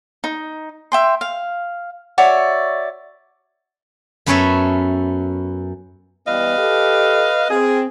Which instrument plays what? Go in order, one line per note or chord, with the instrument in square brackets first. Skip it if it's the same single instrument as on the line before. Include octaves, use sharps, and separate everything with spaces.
[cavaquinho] D#4
E5 G5 C6
F5
F#4 C#5 D5 E5
[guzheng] F#2 B3 C#4 A4 C#5 E5
[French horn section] E3 G3 B3 [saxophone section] B4 D#5 F5
[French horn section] G4 A4
[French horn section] C4 [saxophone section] G#4